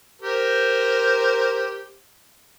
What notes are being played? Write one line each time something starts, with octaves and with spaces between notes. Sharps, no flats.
G4 A#4 C5